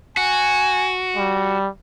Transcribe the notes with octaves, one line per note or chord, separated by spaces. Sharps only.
F#4 G#5
G3